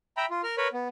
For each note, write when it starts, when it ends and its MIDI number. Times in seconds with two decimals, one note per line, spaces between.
0.17 0.26 76
0.17 0.26 79
0.17 0.26 82
0.17 0.26 83
0.30 0.41 65
0.43 0.56 70
0.43 0.56 89
0.58 0.68 70
0.58 0.68 71
0.58 0.68 73
0.58 0.68 83
0.73 0.88 59